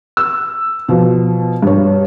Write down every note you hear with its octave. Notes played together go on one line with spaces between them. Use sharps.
E6
B2 F3
G2 C#5